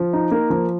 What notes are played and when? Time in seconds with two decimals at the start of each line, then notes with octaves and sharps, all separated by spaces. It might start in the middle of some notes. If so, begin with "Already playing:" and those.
Already playing: F3
0.13 D#4
0.31 A#3
0.50 F3